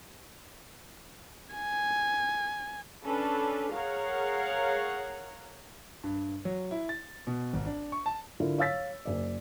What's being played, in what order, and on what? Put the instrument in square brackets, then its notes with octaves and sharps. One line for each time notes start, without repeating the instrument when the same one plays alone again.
[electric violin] G#5
[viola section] C#4 D4 A4 B4
G#4 A#4 C#5 F5 F#5
[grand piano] G2
F#3
E4
A6
B2
G#1
D4
C#6
A5
[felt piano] D3 E4 F4 A#4
C#5 F5 E6 A6 B6
F#1 D5